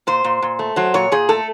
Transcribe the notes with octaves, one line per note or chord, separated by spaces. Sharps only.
A#2 C5
A#2
A#2
A3
F#3 C5
A#2 C#5
A#2 G#4
A3 A4